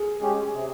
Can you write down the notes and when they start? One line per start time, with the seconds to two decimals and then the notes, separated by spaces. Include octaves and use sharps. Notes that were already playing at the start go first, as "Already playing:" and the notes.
Already playing: G#4
0.20 G#3 C#4 G4
0.54 C3